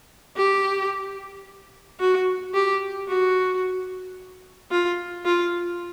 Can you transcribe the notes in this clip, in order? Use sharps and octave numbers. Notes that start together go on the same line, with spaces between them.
G4
F#4
G4
F#4
F4
F4